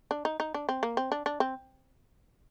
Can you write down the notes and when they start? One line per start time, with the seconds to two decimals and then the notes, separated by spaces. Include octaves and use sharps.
0.11 D4
0.25 D#4
0.40 D#4
0.54 D4
0.69 C4
0.83 A#3
0.97 C4
1.12 D4
1.26 D4
1.40 C4